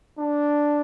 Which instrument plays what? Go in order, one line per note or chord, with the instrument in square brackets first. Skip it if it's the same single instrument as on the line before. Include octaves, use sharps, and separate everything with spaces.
[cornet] D4